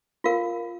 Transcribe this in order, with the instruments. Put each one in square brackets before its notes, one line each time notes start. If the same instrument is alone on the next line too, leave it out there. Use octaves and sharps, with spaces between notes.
[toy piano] F4 A#4 F5